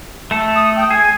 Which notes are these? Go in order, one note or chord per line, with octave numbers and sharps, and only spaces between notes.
A3 A4
D#6
G5
G#4 G#6